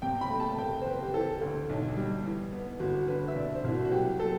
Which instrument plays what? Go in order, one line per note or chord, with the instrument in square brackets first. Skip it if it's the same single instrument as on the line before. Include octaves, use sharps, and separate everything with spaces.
[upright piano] C3 G5
B5
A3
A5
F#1 G5
C5
F#1 B4
G4
E3 A4
D2
B1
G3
E3
B3
G1 F#4
D3 B4
E5
C2 D5
C5
C2 E4
F#4
F#4
F#3 G4
F#3 A4